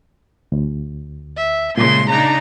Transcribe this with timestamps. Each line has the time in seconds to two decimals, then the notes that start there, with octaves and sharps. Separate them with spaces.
0.52 D2
1.37 E5
1.78 A#2 C#3 G#3 A3 C6
2.10 C#3 D4 D#4 A#5